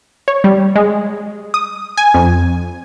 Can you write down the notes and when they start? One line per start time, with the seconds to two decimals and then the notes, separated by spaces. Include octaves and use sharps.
0.28 C#5
0.44 G3
0.76 G#3
1.54 D#6
1.97 G#5
2.14 F2